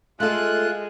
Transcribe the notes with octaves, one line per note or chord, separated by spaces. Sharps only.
G#3 A3 F4 A4 F#6